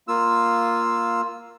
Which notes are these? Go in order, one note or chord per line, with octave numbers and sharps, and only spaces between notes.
A#3 F4 E6